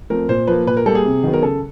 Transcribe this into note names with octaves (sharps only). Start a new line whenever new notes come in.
F3 A3 C4 A#4
A#2 C5
F3 A#3 B4
A#2 B4
A#4
G3 A#3 A4
G#4
C3
D#3 F#3 B3
A#4
C#3 A4